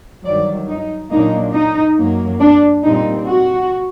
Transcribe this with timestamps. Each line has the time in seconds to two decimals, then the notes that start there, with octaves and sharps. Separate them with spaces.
0.25 G2 D#3 F#3 D5
0.68 D#4
1.12 A#2 F#3 A#3 D4 D#4
1.54 D#4
1.98 F#2 F#3 A#3
2.41 D4
2.84 A#2 G3 C4 D#4
3.27 F#4